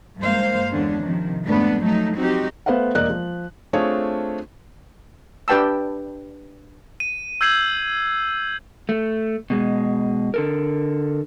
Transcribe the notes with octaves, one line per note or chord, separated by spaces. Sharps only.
G2 G#3 A#3 C5 F5
E2 D3 G#3 C#4 D4
C3 D#3 F3
F2 G#2 A3 B3 D4
F#3 A3 D#4
F#3 C4 D#4 F#4 G4
A3 B3 B4 C5 F5 F#5
E1 A#3 A#4 D5 D#5 F#6
F3
A3 C4 D4 F4 G#4 C#5
D4 G4 B4 G5 A5 E6
D#7
E6 G6 G#6 C7 D#7 F#7
A3
B2 G#3
D3 A4 A#4